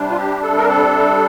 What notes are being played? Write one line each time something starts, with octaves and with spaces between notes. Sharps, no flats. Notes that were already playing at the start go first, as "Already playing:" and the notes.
Already playing: C3 G3 D4
F4
G4
A4
A#4
A4